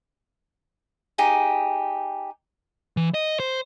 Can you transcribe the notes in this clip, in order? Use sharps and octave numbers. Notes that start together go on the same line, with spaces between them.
D#4 G4 G#4
E3
D#5
C5